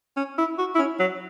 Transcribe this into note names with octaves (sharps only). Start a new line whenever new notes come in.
C#4
E4
F#4
E4
C#4
F#3